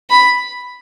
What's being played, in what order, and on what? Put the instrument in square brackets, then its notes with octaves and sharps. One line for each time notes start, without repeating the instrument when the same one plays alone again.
[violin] B5